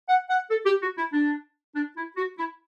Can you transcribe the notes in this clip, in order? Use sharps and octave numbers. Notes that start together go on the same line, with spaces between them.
F#5
F#5
A4
G4
F#4
E4
D4
D4
E4
F#4
E4